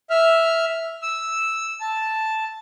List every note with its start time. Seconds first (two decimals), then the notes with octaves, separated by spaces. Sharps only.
0.10 E5 F6
1.02 E6
1.81 A5